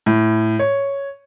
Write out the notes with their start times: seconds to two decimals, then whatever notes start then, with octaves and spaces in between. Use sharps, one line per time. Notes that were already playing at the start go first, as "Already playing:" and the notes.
0.06 A2
0.59 C#5